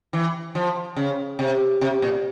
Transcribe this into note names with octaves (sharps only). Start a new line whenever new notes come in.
E3
F3
C#3
C3
C3
A#2